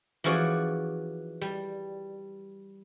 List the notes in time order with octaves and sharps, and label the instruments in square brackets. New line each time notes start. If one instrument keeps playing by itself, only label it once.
[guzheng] E3 F3 C#4 F#4 G#4 D5
G3